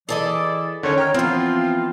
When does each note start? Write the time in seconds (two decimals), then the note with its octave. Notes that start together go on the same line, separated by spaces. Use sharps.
0.09 E3 E4 G#4 A4 D5 D#5
0.83 D3 D#3 C#4 C#5
0.98 G5 A#5 F6
1.14 E3 F3 B3 C4 F4 G5